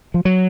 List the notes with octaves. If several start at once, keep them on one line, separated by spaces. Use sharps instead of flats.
F3
F#3